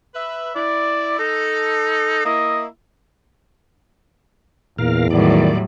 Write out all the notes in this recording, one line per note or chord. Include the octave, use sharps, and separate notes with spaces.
B4 E5
E4 D5
D#4 A4
A#3 E4 D#5
E2 A#2 A#4 F5
A2 D#3 F#3 G3 D5